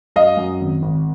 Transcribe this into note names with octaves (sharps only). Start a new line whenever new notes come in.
F#2 D#5 F5
F#2
G#1
G#1